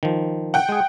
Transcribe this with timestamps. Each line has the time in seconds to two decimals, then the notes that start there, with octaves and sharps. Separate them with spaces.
0.03 D#3 F3
0.54 F#5 G5
0.69 G#3 G#4